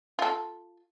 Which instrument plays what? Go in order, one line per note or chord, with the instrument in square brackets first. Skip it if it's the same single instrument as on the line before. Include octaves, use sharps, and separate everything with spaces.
[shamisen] F4 A4